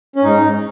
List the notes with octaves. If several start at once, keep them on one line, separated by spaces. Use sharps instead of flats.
C#4
G#2 D#4